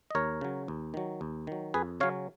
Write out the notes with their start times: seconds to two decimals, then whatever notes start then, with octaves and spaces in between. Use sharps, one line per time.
0.11 D#5
0.15 D#2 A#4 C#5
0.41 C#3 F#3
0.68 D#2
0.94 D#3 F#3
1.21 D#2
1.47 D#3 F#3
1.74 F2 G#4 B4
2.00 C#3 F#3 C#4 C#5 F5